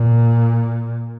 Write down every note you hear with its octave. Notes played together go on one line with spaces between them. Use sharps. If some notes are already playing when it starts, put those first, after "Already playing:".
Already playing: A#2